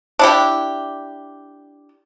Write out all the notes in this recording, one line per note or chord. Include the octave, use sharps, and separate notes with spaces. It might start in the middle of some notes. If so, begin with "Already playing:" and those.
D4 E4 G4